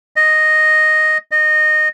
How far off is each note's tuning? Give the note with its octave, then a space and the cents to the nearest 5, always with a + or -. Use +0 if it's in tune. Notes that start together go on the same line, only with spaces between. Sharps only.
D#5 -5
D#5 -20